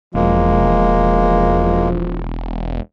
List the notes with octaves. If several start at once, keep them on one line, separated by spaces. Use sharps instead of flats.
E1 F3 G#3 A#3